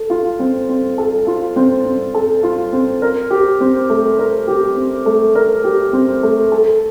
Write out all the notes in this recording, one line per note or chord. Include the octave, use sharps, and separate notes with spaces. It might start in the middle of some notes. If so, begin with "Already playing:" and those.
Already playing: A4
F4
C4
C4
A4
F4
C4
C4
A4
F4
C4
A#4
G4
C4
A3
A#4
G4
C4
A3
A#4
G4
C4
A3
A4